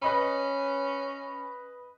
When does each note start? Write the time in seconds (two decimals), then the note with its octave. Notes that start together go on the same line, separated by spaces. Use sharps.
0.02 C#4 B4 D#5 B5